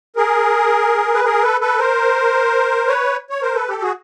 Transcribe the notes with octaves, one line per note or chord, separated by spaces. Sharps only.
G#4 A#4
B4
G#4 A#4
A4 B4
A4 B4
A#4 C5
B4 C#5
C#5
A#4 C5
A4 B4
G4 A4
F#4 G#4